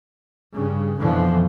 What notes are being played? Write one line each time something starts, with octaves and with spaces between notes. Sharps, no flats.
G2 C#3
F2 B2 D3 E3 F3